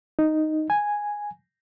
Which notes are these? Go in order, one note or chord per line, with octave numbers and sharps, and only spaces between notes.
D#4
G#5